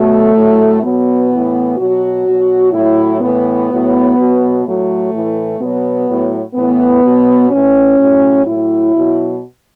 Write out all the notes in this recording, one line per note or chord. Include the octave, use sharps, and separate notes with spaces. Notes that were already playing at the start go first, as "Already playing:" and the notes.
Already playing: B2 F#3 A3
A2 F#3
B2 F#3 B3
A2 E3
B2 F#3 F#4
B2 F#3
A2 F#3 E4
A2 E3 B3
A2 F#3
B2 F#3
A2 F#3 A3
A2 E3
B2 F#3 B3
A2 F#3
A2 E3 B3
B2 F#3
A2 E3 C#4
A2 F#3
A2 F#3 E4
B2 F#3